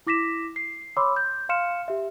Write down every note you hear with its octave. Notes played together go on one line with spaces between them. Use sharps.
E4 D6 A#6 B6 E7
C7
C#5 B5 C6 D6 E6
G6
F5 C6 F6 C#7 E7
G4 E5